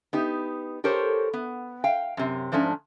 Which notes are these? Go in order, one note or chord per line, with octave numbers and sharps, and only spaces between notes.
B3 D#4 G4
G4 A4 A#4 C5 C#5
B3
F5 G5
F#2 C3
G#2 F3 A3 C#4 D4